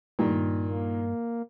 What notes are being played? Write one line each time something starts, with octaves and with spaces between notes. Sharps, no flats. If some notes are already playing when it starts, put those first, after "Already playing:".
G2 A#2 D#3
A#3